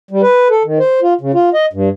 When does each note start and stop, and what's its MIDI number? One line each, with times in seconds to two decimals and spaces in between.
0.11 0.22 55
0.22 0.48 71
0.50 0.63 69
0.65 0.78 51
0.79 1.00 72
1.02 1.14 65
1.21 1.32 49
1.34 1.49 65
1.54 1.66 75
1.73 1.89 43